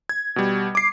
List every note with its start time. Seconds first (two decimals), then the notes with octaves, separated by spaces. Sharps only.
0.09 G#6
0.36 B2 G3
0.75 D6 C7